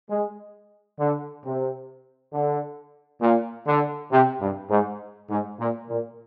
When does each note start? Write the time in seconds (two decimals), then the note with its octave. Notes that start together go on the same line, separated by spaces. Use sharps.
0.10 G#3
0.99 D3
1.44 C3
2.33 D3
3.22 A#2
3.67 D3
4.12 C3
4.41 G2
4.70 G#2
5.30 G#2
5.60 A#2
5.90 A#2